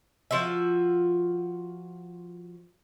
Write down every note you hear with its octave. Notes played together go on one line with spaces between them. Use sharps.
F3 F4 F#4 E5